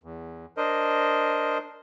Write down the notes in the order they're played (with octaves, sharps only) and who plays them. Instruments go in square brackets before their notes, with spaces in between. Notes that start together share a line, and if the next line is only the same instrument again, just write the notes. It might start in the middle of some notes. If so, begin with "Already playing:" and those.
[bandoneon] E2
D4 A#4 C5 D#5